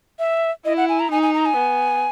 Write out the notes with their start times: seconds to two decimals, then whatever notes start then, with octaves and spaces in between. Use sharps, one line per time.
0.19 E5
0.65 E4 D#5
0.77 F#5
0.89 G#5
1.00 A#5
1.11 D#4 G#5
1.23 G#5
1.34 A#5
1.45 G#5
1.56 B3